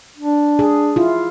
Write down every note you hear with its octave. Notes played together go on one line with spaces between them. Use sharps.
D4
G#4
E4 F4